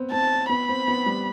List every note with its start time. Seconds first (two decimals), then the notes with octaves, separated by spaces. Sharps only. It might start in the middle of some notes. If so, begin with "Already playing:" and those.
Already playing: B3 C4
0.12 C4 A5
0.49 B3 B5
0.69 C4
0.88 B3
1.06 G3